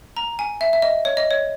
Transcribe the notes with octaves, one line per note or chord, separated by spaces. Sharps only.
A#5
G#5
E5
E5
D#5
C#5
D#5
C#5